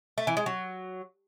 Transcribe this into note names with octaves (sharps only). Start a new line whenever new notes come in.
A3
E3
G#3
F#3